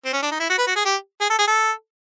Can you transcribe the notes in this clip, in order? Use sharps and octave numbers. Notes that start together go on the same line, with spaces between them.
C4
C#4
D4
D#4
E4
F#4
B4
F#4
G#4
G4
G#4
A4
G#4
A4